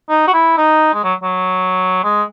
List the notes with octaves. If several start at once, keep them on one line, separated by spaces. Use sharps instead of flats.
D#4
F#4
E4
D#4
G#3
F#3
F#3
G#3